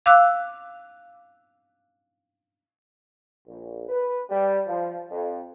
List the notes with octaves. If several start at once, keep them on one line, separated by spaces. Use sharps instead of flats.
F5 D6 E6 F#6
A#1
B4
G3
F3
F2